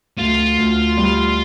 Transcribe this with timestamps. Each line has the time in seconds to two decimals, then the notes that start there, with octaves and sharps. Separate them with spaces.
0.19 D2 F4
0.58 D2
0.97 G3